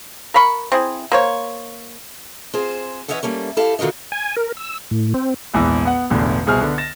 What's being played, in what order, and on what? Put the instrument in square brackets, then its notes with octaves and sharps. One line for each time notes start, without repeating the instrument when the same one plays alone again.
[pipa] A#4 F5 B5 C#6
C4 E4 G#4
A#3 C5 C#5
[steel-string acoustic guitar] C4 F4 G#4 C5
E3 C#4 C#5 D#5 E5 F#5
G3 A3 A#3 C#4
E4 G4 A4 F5
D3 D#3 F4 F#4 D#5
[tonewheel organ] G#5
A#4
E6
A2
C4
[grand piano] A#1 E2 G#2 E3
B3 F#5
E1 A1 E2 D3
C2 B2 G#4 C5 F6
D3 B3
A6 A#6 E7